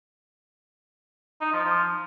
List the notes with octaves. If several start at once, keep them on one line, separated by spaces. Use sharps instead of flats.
D#4
F3
F3